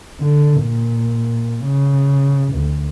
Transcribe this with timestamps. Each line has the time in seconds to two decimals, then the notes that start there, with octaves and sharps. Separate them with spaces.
0.20 D3
0.62 A#2
1.65 C#3
2.54 D2